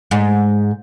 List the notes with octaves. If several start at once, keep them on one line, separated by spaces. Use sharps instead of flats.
G#2